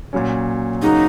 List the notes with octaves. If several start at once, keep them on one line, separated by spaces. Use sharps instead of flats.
A#2 F#3 C#4
C#3 F#3 A#3 D#4 F#4